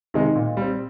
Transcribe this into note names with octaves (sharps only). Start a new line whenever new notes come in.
C3 D#3 G#3 D#4
A#2
G3 C4